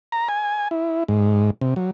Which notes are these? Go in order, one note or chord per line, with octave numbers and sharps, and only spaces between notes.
A#5
G#5
E4
G#2
C3
F#3